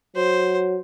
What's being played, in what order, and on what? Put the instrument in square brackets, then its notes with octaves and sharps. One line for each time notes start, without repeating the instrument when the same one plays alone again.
[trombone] F#3 [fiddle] C5